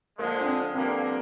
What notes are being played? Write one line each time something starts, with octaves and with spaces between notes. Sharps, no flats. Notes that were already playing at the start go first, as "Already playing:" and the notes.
D3 F3 G#3 A#3
D4
C4
G2 D3 F3 A#3 C4